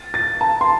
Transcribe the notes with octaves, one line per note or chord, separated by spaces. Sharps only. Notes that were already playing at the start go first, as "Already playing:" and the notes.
Already playing: A6
A6
A5
C6